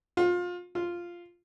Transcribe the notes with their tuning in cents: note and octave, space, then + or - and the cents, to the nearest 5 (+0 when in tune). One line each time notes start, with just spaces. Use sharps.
F4 +25
F4 -5